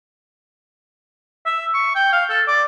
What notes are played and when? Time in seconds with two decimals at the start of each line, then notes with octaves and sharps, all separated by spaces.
1.46 E5
1.74 C#6
1.95 G5
2.13 F5
2.30 A4
2.48 D5